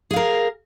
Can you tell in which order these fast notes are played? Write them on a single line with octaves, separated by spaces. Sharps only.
G#4 F5 A#4